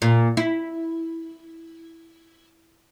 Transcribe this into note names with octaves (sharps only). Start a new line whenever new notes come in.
A#2
E4